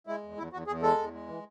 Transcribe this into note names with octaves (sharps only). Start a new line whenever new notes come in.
G#3 E4
E2
E2 E4
E2 F#4
E2 G#4
G#3 A4
E2
G#3
E3